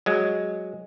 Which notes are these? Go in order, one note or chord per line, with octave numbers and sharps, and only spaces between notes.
F#3 G#3